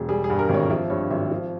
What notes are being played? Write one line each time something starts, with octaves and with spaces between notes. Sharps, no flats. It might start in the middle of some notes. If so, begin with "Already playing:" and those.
Already playing: E1
G3 G#4
G#4
G2
A#4
G#1
C#5
F3 E5
G2 C#5
G#1 E5
F3